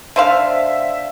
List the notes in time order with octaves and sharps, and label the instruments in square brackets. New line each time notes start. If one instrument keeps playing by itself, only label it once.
[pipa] D3 C5 F5 [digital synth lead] E5